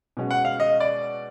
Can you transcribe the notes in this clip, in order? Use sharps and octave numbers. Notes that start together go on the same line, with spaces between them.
B2 G#3 C#4 F#4
F#5
F5
D#5
D5